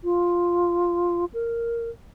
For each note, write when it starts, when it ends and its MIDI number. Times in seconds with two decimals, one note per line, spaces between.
0.04 1.25 65
1.34 1.89 70